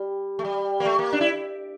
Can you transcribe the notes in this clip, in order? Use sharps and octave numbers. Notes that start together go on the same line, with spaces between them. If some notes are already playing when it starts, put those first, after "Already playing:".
Already playing: G3
A3
G3
A#3
A3
A#3
D4
E4